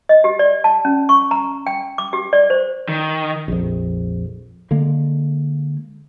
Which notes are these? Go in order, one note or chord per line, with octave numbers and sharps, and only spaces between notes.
D#5
G4
D5
A5
C#4
C#6
A#5
G5
D6
G4
D5
C5
D#3
A#1 F2
D3 G#3 A#3